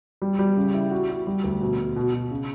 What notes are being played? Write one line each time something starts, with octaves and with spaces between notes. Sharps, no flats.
G3
G3
C#3
E4
F#4
F#4
G3
D2
B2
B2
B2
B2
C#3